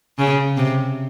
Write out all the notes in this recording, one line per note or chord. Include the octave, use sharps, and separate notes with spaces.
C#3
C3